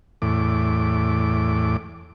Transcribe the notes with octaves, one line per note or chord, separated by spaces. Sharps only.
E2 A2 D6